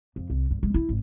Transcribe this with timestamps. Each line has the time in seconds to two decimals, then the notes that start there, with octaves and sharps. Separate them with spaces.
0.16 F2
0.30 C2
0.51 G2
0.63 G#3
0.74 E4
0.89 G#1